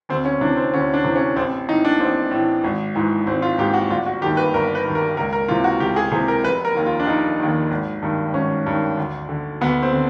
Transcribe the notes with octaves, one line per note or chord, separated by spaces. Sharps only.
D2 C4
C#4
C3 E3 D4
C4
D2 C#4
D4
C3 E3
C#4
A1 C4
A2 E3 D#4
D4
A1 C4
A2 E3
G#1
G#2 E3
G#1 C4
F4
G#2 E3 G4
F#4
G1 F4
F#4
G2 D#3 G4
B4
G1 A#4
B4
G2 D#3
A#4
C#2 A#4
A#4
C3 E3 F4
F#4
C#2 G4
G#4
C3 E3 G#4
A#4
F1 B4
A#4
D#2 D#3
F4
D4
F1 D#4
D#2 D#3
G#1
G2 D#3
G#1 C#4
G2 D#3
D2
D3
D2 B3
C4
D3